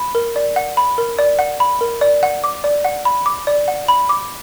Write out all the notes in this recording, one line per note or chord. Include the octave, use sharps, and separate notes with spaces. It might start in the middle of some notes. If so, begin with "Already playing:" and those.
Already playing: B5
A#4
D5
F#5
B5
A#4
D5
F#5
B5
A#4
D5
F#5
D6
D5
F#5
B5
D6
D5
F#5
B5
D6